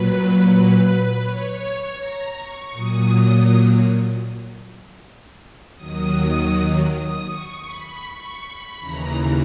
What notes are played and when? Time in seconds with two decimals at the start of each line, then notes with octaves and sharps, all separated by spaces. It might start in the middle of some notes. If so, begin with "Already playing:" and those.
Already playing: A#2 F#3 B4
0.44 B4
1.19 C#5
1.95 A#5
2.33 C#6
2.71 A#2 F#3 D#6
5.75 D#2 D#3 F#3 D#6
6.90 D#6
7.27 C#6
7.65 B5
8.04 C#6
8.42 B5
8.79 D#2 C#3 E3 A#5